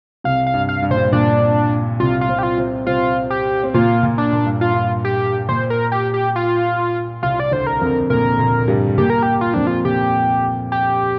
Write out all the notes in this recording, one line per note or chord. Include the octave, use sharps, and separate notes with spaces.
C2 C3 F5
F5
G2
F5
G2
A#2 C5
G2
A#2 D4
C2 C3 F4
F4
C3 C4
G4
F4
C3 C4
C3 C4 F4
G4
C4
A#2 A#3 F4
A#2
D4
A#2
G2
F4
G2
G4
A#2 C5
A#4
G4
G4
F4
C2 C3 F4
D5
D2 D3 C5
A#4
F2 F3
A#2 A#3 A#4
A#2 A#3
G2 G3
A#2 A#3 G4
A#4
G4
F4
F2 F3 D4
F4
A#2 G4
G4